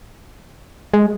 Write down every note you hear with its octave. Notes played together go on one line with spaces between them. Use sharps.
G#3